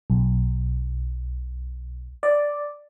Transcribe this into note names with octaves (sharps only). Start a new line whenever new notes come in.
B1
D5